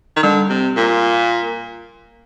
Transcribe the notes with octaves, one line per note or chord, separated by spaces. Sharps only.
D#3
D3 G3
C3
A#2